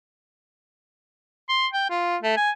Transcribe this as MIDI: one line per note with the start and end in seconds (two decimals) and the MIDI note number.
1.49 1.67 84
1.73 1.87 79
1.90 2.17 65
2.23 2.35 57
2.37 2.51 80